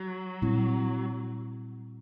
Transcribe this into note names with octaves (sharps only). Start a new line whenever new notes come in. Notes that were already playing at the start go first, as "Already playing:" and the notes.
Already playing: F#3
A#2 G3 C4 E4